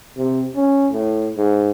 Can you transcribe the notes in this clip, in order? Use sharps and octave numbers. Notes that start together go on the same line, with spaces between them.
C3
C#4
A2
G#2